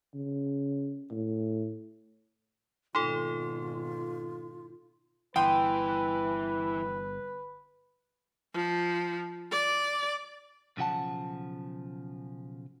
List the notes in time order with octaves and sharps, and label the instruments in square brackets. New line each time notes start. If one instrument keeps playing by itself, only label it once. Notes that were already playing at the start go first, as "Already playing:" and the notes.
[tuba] C#3
A2
[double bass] G#1 B2 [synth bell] D#4 A4 [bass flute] F4 [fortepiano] C6
[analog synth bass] G1 [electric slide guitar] E3 [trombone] B4 [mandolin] G5 C6 D#6
[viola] F3
D5
[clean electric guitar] B1 C#3 F3 F#5 A5